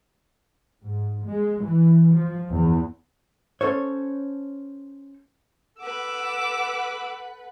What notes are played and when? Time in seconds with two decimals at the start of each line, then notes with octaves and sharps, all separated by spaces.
0.82 G#2
1.26 G#3
1.62 E3
2.15 F3
2.52 E2
3.61 C#4 A4 C5 C#5
5.80 A4 B4 F#5 D6 E6